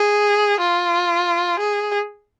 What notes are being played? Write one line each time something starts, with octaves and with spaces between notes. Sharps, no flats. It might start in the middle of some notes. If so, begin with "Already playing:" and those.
Already playing: G#4
F4
G#4